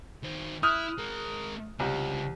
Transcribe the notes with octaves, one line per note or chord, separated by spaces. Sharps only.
D#3 C5
E4 D#6 F6 F#6
G#3 A#4
C2 C#3 F4